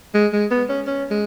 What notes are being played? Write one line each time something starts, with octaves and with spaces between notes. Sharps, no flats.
G#3
G#3
B3
C#4
C#4
G#3